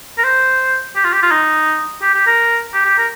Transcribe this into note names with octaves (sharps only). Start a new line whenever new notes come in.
A#4
C5
G4
F4
G4
F4
D#4
G4
G4
A#4
G4
G4
A#4